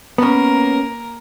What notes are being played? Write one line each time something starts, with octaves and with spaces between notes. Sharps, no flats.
A#3 B3 C#4 A#4